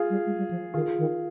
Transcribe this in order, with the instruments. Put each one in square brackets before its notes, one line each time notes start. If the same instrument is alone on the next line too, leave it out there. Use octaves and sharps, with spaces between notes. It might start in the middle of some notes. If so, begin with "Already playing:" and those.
Already playing: [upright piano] F4 G#4
[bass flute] G3
G#3
G3
F3
[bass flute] D#3 [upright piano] F4 G#4
[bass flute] D#3